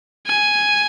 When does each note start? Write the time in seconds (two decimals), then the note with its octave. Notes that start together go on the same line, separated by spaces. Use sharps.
0.27 G#5